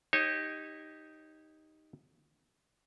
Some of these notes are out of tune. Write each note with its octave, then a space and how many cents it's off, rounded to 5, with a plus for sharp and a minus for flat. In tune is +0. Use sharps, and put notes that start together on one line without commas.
D#4 +0 G4 +0 C#5 -30